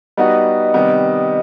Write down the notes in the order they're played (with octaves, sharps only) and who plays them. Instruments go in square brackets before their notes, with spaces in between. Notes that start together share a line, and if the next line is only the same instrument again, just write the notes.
[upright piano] G3 B3 D#4 F#4 [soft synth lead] D#5
[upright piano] C3 D#3 G3 B3